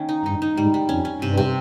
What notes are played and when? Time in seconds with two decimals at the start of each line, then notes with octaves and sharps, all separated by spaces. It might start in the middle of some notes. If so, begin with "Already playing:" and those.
Already playing: D#3 A#3 C#4
0.09 D#4
0.25 G2 D#4
0.42 D#4
0.57 G#2 G3
0.74 G3
0.89 F2 C#4
1.05 C#4
1.21 G2 C3
1.37 C3